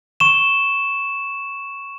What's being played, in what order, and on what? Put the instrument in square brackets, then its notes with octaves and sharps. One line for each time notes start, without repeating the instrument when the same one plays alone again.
[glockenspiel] C#6 E7